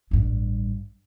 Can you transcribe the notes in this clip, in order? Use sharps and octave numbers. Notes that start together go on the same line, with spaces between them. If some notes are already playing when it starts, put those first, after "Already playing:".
A1 G2